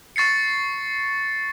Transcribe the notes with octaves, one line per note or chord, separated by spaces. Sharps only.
C#6 A6 C7 C#7